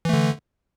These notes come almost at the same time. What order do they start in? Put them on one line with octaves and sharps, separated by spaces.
E3 A3 D3